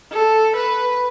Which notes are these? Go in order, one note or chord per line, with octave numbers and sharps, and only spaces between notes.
A4
B4